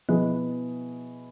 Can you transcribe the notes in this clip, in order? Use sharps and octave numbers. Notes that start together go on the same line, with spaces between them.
B2 F3 B3 E4 G#4